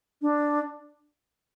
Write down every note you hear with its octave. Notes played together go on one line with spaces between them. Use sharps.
D4